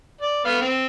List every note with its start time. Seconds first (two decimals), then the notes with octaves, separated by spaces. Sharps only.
0.22 D5
0.45 A3 B3 F5
0.61 C4